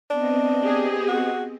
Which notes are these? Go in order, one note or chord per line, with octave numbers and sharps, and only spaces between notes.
B3 C4 D4 D#5
G4 G#4
F#4